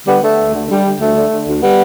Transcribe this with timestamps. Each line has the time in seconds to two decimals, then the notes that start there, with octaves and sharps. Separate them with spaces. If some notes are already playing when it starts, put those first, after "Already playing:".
0.07 D3 G3 B3
0.23 D3 A3
0.38 D2
0.54 D3
0.70 D3 G3
0.85 D3
1.00 D2 A3
1.16 D3
1.31 D3
1.47 D2
1.62 G3 B3